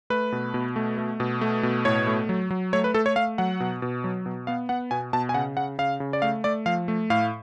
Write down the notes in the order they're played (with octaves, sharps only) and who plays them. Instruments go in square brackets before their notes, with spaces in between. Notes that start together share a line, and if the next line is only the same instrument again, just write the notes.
[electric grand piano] A3 B4
B2
B2
A3
A3
B2
A3
B2
A2 C#5
A3
F#3
F#3
A3 C#5
B4
A3 A4
C#5
A3 F5
F#3 F#5
B2
B2
F#3
B2
B3 F5
B3 F#5
B2 G#5
B2 A5
G#5
C#3 F#5
C#3 F#5
C#3 F5
C#3
D5
A3 F5
A3 D5
F3 F5
A3
A2 F5